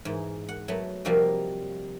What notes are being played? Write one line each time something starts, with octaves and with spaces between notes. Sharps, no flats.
G#2 E3
F#5
F#3 A3 B3
C3 F3 G3 A#3 D#4 F#4